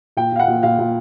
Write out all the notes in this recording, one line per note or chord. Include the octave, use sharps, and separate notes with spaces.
A#2 G5
A#2 F5
F#5
A#2
A#2 F5
A#2